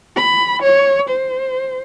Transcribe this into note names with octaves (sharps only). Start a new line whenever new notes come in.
B5
C#5
C5